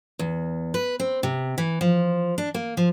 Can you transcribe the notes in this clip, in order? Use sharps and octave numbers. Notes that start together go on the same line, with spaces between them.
E2
B4
C4
C3
E3
F3
D4
A#3
F3